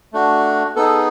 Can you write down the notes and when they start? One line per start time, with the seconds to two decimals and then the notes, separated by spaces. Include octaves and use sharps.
0.13 A3 D4 F#4
0.76 B3 D#4 G#4 A4